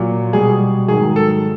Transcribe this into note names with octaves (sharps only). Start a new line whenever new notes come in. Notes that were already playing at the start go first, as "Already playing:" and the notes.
Already playing: A#2 F#3
B2 G3 G#4
G#2 D#3 F#3 G#4
A4